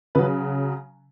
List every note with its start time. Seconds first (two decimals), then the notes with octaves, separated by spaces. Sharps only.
0.15 C#3 F#3 B4